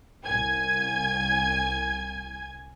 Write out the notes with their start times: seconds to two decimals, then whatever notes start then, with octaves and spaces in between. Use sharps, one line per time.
0.23 C2 G#5 G#6